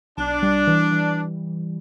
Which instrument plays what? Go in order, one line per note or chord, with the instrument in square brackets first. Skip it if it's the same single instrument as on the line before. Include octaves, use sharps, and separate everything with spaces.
[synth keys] B1 [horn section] D4
[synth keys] G3
E3
E3